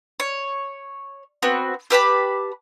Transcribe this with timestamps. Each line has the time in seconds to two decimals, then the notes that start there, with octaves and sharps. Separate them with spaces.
0.20 C#5
1.42 B3 C4 F#4
1.90 G4 B4 A5 B5